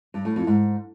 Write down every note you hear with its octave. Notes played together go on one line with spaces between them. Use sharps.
G2
A2
F2
G#2